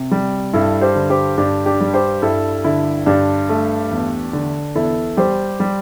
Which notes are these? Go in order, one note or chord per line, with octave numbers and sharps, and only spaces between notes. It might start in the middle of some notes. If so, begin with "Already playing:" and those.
Already playing: C3
G3
G2 E4 A4
G4 C5
D3
G4 C5
G2 D4 G4
D4 G4
G3
G4 C5
G2 E4 A4
D3 E4
G2 D4 G4
A3
E2
D3
E2 E4 A4
G3 G4 C5
G3